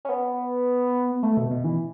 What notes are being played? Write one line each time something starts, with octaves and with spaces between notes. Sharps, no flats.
C#4
B3
A3
B2
B2
E3